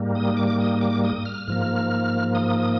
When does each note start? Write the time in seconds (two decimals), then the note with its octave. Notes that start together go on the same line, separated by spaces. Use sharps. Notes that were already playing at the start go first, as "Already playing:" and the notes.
Already playing: G#2 G3 A#3
0.15 D#6
0.37 D6
0.59 D#6
0.81 D6
1.03 D#6
1.25 F6
1.48 G#2 F3 A#3
2.35 D#6